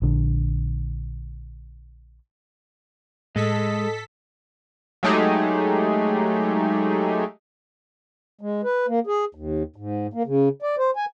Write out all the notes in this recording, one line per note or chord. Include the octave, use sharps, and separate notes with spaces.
A#1 D3
A2 G#3 A4 D#5 B6
F#3 G#3 A3 D#4 G4 G#4
G#3
B4
A#3
G#4
D#2
G#2
A#3
C#3
D5
C5
G#5